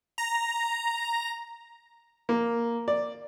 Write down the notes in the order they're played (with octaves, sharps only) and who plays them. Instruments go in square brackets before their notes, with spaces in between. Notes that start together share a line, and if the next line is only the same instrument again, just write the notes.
[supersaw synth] A#5
[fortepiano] A#3
D5